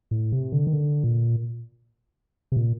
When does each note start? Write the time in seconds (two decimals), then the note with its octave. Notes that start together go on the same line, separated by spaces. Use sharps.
0.11 A2
0.32 C3
0.52 D3
0.67 D#3
0.73 D3
1.04 A#2
2.52 C3
2.57 A#2